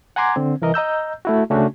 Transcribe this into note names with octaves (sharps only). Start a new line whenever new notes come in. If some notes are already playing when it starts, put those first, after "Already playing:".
F#5 G#5 A#5 C6 D6 G#6
D3 C4
C2 E3 A#4 D#5
D#5 A#5 E6 G6
A3 E4 F#4
C#3 A3 C#4 D4 F#4